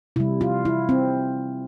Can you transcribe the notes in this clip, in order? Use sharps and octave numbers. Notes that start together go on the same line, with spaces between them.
C3 G3 E4
F4
E4
C4